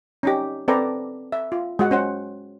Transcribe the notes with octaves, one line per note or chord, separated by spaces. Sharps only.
C#4 D#4 G4
C4 A4 B4 D5 G5 A#5
E5
F4
G#3 F#4 F#5
C#4 C5 F#5